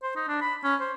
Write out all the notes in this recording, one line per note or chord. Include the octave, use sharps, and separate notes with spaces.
C5
D#4
D4
B5
C#4
C5